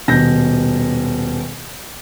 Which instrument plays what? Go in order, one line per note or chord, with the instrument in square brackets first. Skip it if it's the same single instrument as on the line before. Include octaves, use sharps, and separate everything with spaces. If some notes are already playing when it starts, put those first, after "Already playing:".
[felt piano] D#1 B2 G6 A#6